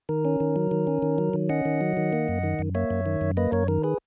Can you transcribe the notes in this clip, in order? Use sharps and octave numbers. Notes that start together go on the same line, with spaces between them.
D#3 A#4
C#4
D#3
F#3
D#3
C#4
D#3
F#3
D#3
C#4 D#5 F#5
D#3
F#3
D#3
A#3
F#2
D#3
F#2
A#3 C#5 E5
F#2
D#3
F#2
A#3 B4 D#5
F#2 A#4 C#5
D#3 A#4
G#4 B4